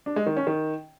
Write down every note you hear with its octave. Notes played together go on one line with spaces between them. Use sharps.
D4
G#3
D#3
C#4
D#3